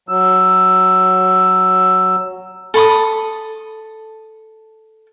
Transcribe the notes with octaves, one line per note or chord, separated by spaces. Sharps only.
F#3 E6
A4 B5 C6 D#6